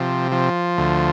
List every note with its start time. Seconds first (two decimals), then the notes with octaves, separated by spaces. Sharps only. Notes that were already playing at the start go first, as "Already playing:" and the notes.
Already playing: C3 F3
0.32 F3
0.78 D2